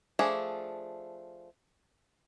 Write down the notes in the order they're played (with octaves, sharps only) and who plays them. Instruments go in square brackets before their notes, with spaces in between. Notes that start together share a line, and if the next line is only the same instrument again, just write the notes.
[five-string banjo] F3 A3 D4 G#4